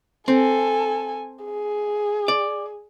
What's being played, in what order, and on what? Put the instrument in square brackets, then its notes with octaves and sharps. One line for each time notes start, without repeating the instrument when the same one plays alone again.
[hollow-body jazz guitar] C4 [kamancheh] A4 G#5
[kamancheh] G#4
[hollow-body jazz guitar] D5